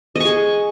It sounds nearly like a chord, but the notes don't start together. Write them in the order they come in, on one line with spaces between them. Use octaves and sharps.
D#5 C#6 G#4